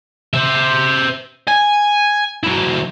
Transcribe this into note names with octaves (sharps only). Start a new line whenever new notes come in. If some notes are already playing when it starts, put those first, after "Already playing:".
C5 E5
G#5
F#3 E4